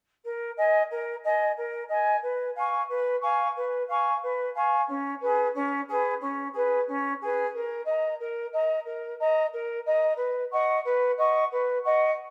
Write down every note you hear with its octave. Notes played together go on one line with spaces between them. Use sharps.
A#4
D#5 G#5
A#4
D#5 G#5
A#4
D#5 G#5
B4
F5 G#5 C#6
B4
F5 G#5 C#6
B4
F5 G#5 C#6
B4
F5 G#5 C#6
C#4
G#4 B4
C#4
G#4 B4
C#4
G#4 B4
C#4
G#4 B4
A#4
D#5 A#5
A#4
D#5 A#5
A#4
D#5 A#5
A#4
D#5 A#5
B4
D#5 F#5 C#6
B4
D#5 F#5 C#6
B4
D#5 F#5 C#6